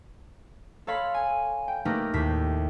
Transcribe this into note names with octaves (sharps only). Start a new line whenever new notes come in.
A4 C#5 F5 B5 C6
G#5
G5
A3 A#3 D#4 G4 A#4 B4
D#2 A2 B6 C7